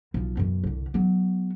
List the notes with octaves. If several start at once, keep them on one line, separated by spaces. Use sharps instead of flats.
B1 F3
F#2 B2
C2 D3
F#3 B3